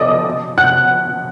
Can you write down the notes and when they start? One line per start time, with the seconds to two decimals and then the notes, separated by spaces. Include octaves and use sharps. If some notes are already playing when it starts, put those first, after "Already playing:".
Already playing: A4 D5 D#5 D6 D#6
0.58 F#5 F#6